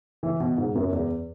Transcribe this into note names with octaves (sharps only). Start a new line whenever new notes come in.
E3
B2
G#2
F#2
E2